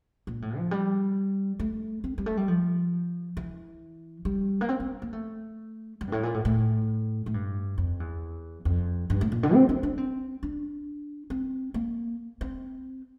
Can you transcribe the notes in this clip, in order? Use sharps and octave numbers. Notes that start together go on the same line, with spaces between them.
A#2
A2
F3
G3
A3
C4
G3
A3
G3
F3
E3
G3
A#3
C4
C4
A#3
A3
G3
G2
A2
A#2
A2
A2
A2
G2
F2
E2
F2
G2
A2
A#2
D3
C4
D4
D4
C4
D4
C4
A#3
C4